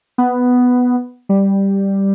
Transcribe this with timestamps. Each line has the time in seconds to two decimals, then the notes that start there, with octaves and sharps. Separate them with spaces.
0.18 B3
1.29 G3